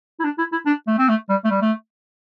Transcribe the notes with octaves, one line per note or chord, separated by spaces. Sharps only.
E4
D4
E4
E4
D4
A3
C4
A3
G3
A3
G3
A3